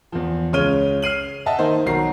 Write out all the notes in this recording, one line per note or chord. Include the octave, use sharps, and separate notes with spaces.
E2 F3
C#2 C#3 C#5 F6 D#7 G7
F6 C7 D#7 F#7
D#5 E5 F#5 A5
D#3 A#3 D#4 C5
B1 D#3 F#4 A#5 C7